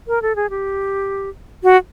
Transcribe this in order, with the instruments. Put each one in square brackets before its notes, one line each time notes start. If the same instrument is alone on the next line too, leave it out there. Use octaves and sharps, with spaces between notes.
[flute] A#4
A4
G#4
G4
F#4